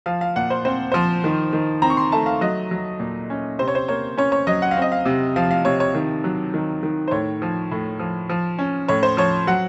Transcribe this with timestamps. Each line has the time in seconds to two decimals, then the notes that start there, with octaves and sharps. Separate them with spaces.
0.06 F3 F5
0.21 F5
0.36 A#2 F#5
0.50 C5
0.65 C4 C5
0.92 F3 C5
1.24 D#3
1.53 D#3
1.82 C4 A#5
1.90 C#6
1.97 C6
2.12 A3 A5
2.26 F5
2.41 F#3 D#5
2.71 F#3
3.00 A#2
3.30 C#4
3.59 C3 C5
3.68 C#5
3.75 C5
3.88 A#3 C#5
4.17 C#4 C#5
4.32 C#5
4.47 F#3 D#5
4.62 F#5
4.71 F5
4.76 C4
4.82 D#5
4.92 F5
5.05 C3
5.36 F3 F5
5.51 F5
5.65 C3 C#5
5.80 C#5
5.95 D#3
6.24 F#3
6.54 D#3
6.83 D#3
7.08 C5
7.11 A2 C#5
7.42 F3
7.71 A2
7.99 F3
8.29 F3
8.59 C#4
8.88 A2 C#5
9.03 C5
9.17 F3 C#5
9.47 F#3 F#5